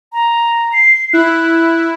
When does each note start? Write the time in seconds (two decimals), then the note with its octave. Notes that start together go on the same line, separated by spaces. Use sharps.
0.13 A#5
0.73 C7
1.13 E4 F#6